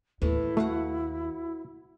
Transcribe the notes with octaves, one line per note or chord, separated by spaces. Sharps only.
D#2 A2 E3 B3 E4
A3 F#4 F5 F#5